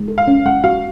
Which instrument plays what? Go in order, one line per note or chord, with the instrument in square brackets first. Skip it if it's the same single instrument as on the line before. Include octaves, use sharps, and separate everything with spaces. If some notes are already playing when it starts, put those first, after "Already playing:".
Already playing: [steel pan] G#3
A4
[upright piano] F5
[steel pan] C#4
[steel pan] G#3 [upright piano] F#5
[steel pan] F#4 [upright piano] F5